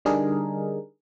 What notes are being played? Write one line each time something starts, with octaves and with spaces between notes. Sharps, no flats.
D3 G3 D4 D#4 G#4 A#4